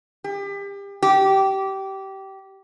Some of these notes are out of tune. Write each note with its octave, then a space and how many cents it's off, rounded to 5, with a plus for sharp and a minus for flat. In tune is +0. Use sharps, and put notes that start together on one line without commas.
G4 +30
G4 -20